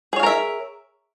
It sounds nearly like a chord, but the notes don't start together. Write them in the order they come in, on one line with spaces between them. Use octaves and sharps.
G#4 C#5 F5 A#4 E5